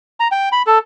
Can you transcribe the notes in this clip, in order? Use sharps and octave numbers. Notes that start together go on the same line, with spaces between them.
A#5
G5
B5
A4